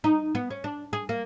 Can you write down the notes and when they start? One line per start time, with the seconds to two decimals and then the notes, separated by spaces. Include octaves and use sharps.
0.04 D#4
0.35 B3
0.51 C#4
0.64 D4
0.93 G#4
1.09 A#3